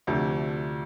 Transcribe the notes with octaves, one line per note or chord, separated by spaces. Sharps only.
D2 C3 F3 A3 D4